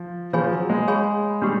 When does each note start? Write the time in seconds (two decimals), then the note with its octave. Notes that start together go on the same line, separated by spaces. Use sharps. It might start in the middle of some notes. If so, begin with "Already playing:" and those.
Already playing: F3
0.33 F3 G#4 C#5 F5 G#5 B5
0.51 F#3
0.70 G#3
0.88 G#4 C#5 F5 G#5 B5
1.42 G3 D4 G4